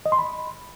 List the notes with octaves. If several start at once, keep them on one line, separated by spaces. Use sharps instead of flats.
D#5
C6
B5